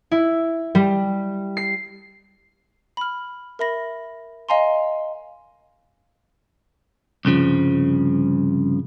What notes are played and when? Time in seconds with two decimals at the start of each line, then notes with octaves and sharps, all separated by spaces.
0.11 E4
0.75 G3
1.57 C7
2.97 B5 F6
3.59 A#4 E5 B5 A#6
4.49 D#5 F5 G#5 A#5 C6
7.25 C2 G2 C#3 F3